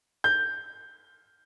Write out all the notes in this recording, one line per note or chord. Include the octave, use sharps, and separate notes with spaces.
G6